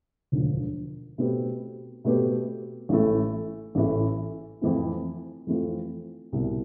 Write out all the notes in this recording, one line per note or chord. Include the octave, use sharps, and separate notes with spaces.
E1 D2 D3 F3
B2 A3 C4 G4 B4
B2 A3 C4 G4 B4
A1 A2 E3 A3
A1 A2 E3 A3
F2 E3 A3 C4 F4
F2 E3 A3 C4 F4
C2 B2 G3